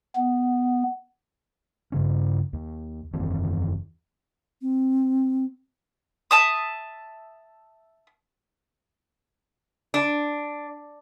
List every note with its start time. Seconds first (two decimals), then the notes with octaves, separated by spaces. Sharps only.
0.16 B3
1.92 G2 C#3 C#4
2.53 D#2
3.13 F#1 E2 D#3 C4
4.62 C4
6.31 E5 A5 D#6
9.94 D4